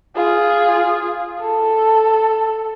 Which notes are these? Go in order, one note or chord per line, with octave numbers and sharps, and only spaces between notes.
F4 G#4
A4